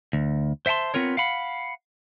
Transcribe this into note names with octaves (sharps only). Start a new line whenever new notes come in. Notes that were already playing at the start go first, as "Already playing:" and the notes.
D2
C5 E5 F#5 A5 C6
B3 C4 F4 A#4 C#5
F5 F#5 B5